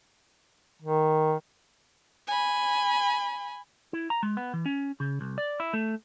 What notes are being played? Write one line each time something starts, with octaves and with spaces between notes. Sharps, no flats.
D#3
G#5 B5
E4
A#5
G#3
B3
E3
C#4
C#3
C2
D5
E4
A3